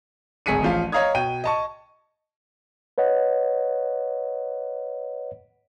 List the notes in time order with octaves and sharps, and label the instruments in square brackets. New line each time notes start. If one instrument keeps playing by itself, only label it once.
[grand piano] D1 G#1 G#4 B6 C#7 D#7
A1 F3 F5
C#5 D#5 F5 A#5 D#6 G#6
B2 G5 D#7
D#5 A5 C#6
[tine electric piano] B4 C#5 D#5 F#5